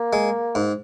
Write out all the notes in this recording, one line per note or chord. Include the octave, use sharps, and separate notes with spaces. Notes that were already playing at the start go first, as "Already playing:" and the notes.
Already playing: A#3
G#3
G#2